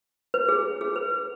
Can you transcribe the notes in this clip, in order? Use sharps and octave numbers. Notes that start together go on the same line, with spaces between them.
B4
G#4
G#4
B4